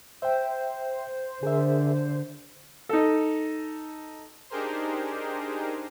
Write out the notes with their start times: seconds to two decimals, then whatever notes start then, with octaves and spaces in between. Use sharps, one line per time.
0.22 C5 E5 G5
1.43 D3 G#4 A#4 E5
2.89 D#4 A4
4.50 D4 D#4 G4 G#4 A#4 C5